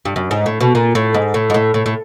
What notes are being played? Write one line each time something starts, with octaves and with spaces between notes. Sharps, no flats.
G2
F#2
G#2
A2
B2
A#2
A2
G#2
A2
G#2
A2
A2
A2